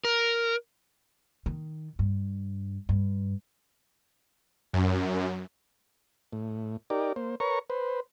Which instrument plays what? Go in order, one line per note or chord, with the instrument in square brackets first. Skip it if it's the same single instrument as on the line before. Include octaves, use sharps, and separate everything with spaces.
[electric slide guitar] A#4
[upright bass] D#3
G2
G2
[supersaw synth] F#2
[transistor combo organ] A2
D#4 G4 A#4 D5
A#3 C5
A#4 B4 C#5 A#5 C#6
B4 C5